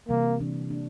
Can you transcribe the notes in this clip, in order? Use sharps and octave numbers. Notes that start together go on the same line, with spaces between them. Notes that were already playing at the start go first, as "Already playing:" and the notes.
C3 E3 G3 A#3
E3 A#3 D4
E3 A#3 D4